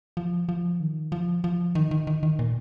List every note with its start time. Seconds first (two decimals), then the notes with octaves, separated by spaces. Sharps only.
0.17 F3
0.49 F3
0.80 D#3
1.12 F3
1.44 F3
1.75 D#3
1.91 D#3
2.07 D#3
2.23 D#3
2.39 A#2